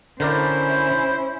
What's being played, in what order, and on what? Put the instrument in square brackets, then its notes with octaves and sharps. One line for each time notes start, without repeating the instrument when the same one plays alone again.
[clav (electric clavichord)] D3 A#4 D5 [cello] C#4 E4 [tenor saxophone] C5